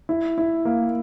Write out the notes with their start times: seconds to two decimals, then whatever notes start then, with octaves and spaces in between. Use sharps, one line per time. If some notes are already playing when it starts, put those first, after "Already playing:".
0.09 E4
0.38 E4
0.65 A#3